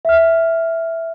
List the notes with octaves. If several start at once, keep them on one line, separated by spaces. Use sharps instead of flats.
E5 F6